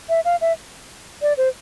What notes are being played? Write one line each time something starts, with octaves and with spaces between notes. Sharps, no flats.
E5
F5
E5
D5
C5